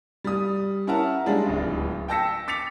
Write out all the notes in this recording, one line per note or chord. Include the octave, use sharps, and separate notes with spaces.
G3 D#6
C#4 E4 A#4 F#5 A5 A#5
G3 G#3 D4 F4
D1 C#2
G5 A5 E6 A#6 B6 C#7
D6 A6 B6 C#7 F7